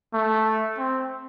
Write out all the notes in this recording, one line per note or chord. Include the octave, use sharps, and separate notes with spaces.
A3
C4